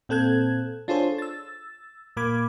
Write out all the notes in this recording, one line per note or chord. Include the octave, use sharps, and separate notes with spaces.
A#2 C4 A4 F#6 G#6
D4 F4 G#4 A4 C5 C#5
E6 A6
A#2 A#3 B5 D6 G#6